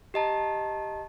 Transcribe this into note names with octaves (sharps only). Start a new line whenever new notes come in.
G4 D#5 A5 A#5